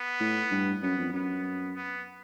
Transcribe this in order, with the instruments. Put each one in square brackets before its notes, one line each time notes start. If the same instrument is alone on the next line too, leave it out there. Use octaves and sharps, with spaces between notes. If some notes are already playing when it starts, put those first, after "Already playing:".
Already playing: [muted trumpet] B3
[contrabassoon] A2
G2
[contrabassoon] F#2 [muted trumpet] B3
[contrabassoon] F2
[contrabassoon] F#2 [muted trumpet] B3
[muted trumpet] B3